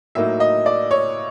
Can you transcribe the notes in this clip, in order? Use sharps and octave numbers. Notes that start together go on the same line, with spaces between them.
A2 F#3 A#3 D#4 E5
D#5
D5
C#5